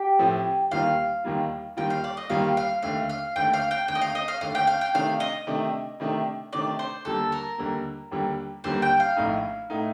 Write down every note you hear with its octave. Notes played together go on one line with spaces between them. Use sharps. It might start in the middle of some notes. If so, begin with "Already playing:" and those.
Already playing: G4
A2 F3 A3 C4
D#2 D#3 G3 A#3 F4 F5
D#2 D#3 G3 A#3 F4
D#2 D#3 G3 A#3 F4 G5
F5
D5
D#5
D#2 D#3 G3 A#3 F4 F5
F5
D#2 D3 A3 F5
F5
D#2 D3 A3 G5
F5
G5
D#2 D3 A3 G5
D#5
F5
D#5
F5
D#2 D3 A3 F5
G5
F5
G5
C3 D#3 A3 D4 F5
D#5
C3 D#3 A3 D4
C3 D#3 A3 D4
C3 D#3 A3 D4 D5
C5
D#2 D3 G3 A#3 A4
A#4
D#2 D3 G3 A#3
D#2 D3 G3 A#3
D#2 D3 G3 A#3 C5
G5
F5
A#1 A2 A3 D#4
A2 A3 D#4